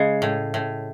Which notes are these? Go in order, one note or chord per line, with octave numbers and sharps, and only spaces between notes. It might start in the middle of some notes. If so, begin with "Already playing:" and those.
Already playing: C#3 G#3 G#4
A2
A2